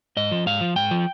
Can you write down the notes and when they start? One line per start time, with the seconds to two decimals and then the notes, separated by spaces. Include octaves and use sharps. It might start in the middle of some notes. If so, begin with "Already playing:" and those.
0.17 G#2 D#5
0.31 F3
0.46 G#2 F5
0.61 F3
0.76 G#2 G5
0.91 F3